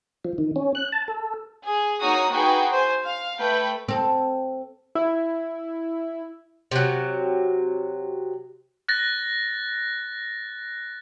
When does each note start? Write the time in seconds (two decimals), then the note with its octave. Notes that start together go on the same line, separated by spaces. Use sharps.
0.24 F3
0.38 D#3
0.56 C#4
0.75 F#6
0.92 A5
1.08 A4
1.65 G#4
2.00 A#3 D#4 F#4 C#5 A#5 D#6
2.29 D#4 F#4 G#4 B4 G5
2.71 C5 G#5
3.04 F5
3.37 A3 B4 G5 B5
3.88 C4 A4
4.95 E4
6.71 C3 F#3
8.88 F#6 A6 A#6